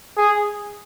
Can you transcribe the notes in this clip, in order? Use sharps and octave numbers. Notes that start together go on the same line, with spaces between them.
G#4